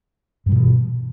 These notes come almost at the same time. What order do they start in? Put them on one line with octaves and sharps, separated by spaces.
G2 G3 B2 E3